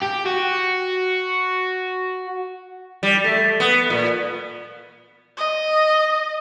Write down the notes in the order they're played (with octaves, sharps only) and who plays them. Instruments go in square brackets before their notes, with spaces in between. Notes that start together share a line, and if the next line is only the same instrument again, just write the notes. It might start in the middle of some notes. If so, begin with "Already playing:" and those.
[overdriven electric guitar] G4
F#4
[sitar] G3
A3
B3
A#2
[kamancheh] D#5